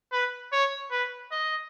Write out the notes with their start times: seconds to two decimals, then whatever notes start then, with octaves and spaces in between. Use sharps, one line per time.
0.12 B4
0.52 C#5
0.91 B4
1.32 D#5